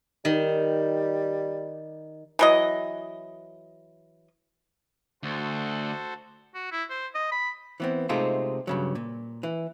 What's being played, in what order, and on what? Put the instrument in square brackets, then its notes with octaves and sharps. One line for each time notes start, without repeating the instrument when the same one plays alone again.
[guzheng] D#3 [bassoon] G3
[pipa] E3 F#3 D#5
[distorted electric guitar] D2 [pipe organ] F#4 A4 C5
[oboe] F#4
E4
C5
D#5
B5
[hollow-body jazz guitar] E3 B3 C4
C3 G#3 A3 C4 D#4 F4
G2 C#3 F#3
A#2
E3